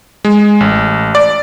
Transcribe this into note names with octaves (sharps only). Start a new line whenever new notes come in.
G#3
A1
D5